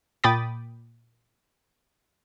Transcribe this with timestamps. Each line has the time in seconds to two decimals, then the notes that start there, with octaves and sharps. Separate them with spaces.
0.24 A#2 G5 B5 D6 D#6 A6